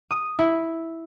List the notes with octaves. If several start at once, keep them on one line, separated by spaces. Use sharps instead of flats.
D#6
E4